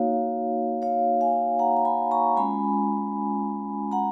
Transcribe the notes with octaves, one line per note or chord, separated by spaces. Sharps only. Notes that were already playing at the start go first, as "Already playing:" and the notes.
Already playing: A#3 D#4 F#4 C#5 F5
C#5 F5
F5 G#5
F#5 A#5
A#5
G#5 B5
A#5 C#6
G#3 C#4 F4 G#5 B5
F#5 A#5